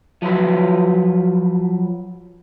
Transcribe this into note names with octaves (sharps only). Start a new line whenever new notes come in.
F3 F#3 F4 B4